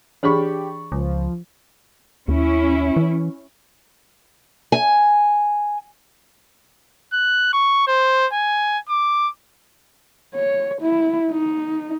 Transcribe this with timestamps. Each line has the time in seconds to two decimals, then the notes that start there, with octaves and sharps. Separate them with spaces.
0.23 E3 D4 G4 G#4 B5 C#6
0.92 C#2 F3
2.28 D#2 C#4 E4
2.96 E3
4.72 G#5
7.13 F#6
7.53 C#6
7.87 C5
8.33 G#5
8.89 D6
10.35 C#5
10.81 E4
11.31 D#4